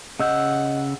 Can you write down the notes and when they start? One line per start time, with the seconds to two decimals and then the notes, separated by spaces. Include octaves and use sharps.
0.20 C#3 D#5 F#5 E6 G6